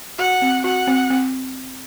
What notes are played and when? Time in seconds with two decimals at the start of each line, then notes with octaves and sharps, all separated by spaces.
0.19 F#4 F#5
0.42 C4
0.64 F#4 F#5
0.87 C4
1.10 C4